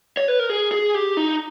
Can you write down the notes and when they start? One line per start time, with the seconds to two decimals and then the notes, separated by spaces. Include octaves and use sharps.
0.17 C#5
0.28 B4
0.39 A#4
0.49 G#4
0.72 G#4
0.94 G4
1.17 D#4